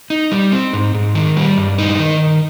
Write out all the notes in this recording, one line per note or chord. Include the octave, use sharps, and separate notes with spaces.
D#4
G3
C4
G#2
G#2
D#3
G3
G2
D#4
D#3